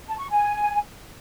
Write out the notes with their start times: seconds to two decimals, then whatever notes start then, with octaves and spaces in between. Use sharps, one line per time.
0.06 A5
0.18 C#6
0.30 G#5